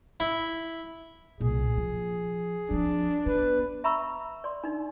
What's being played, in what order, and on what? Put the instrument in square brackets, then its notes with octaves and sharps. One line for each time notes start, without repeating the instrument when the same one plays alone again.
[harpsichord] E4
[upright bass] C2 A#2 [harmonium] G#4
[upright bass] F3
[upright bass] F3 C4 [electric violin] D4
[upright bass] B3 [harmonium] B4
[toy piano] E5 A#5 B5 C#6 E6
D5 C6
D4 D#4